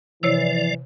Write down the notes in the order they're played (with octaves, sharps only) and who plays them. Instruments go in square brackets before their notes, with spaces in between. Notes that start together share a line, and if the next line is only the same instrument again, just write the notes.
[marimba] C3 C#5 E6 [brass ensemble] E3 [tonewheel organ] F3 D5